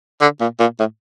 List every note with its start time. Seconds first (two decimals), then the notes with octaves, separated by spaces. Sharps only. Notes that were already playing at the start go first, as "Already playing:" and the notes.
0.21 D3
0.40 A#2
0.60 A#2
0.79 A2